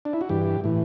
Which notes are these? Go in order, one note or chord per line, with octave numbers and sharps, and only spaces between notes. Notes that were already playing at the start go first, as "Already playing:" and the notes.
D4
E4
F#4
G2 E3 G4
A2 E3